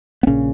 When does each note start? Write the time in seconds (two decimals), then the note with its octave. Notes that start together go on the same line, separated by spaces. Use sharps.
0.23 B3
0.27 A#1 A#2 C#3 C#4